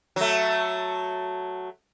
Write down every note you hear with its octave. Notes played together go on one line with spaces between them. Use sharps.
F#3 A3